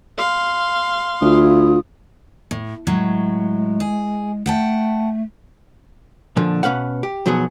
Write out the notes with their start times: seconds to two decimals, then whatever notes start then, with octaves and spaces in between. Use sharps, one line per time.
0.18 F5 C6
1.22 D2 E4 F4 D#6
2.51 A2
2.87 A2 F#3 G#3
3.80 G#4
4.46 A3 F#5 G5 A5
6.36 A#2 D3 F3
6.63 B2 C#4 B4 F5 F#5
7.03 G4
7.26 B1 F3 F#3 B3 G#4